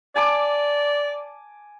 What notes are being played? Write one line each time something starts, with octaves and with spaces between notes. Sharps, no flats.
D5 G#5 A5 D6